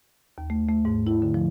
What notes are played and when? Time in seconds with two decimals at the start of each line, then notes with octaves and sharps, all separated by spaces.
0.38 D#2
0.50 A3
0.69 A3
0.85 G#2
1.07 E4
1.22 D3
1.34 F3